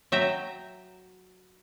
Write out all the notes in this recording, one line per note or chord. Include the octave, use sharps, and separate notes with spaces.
F#3 E5 G5 A#5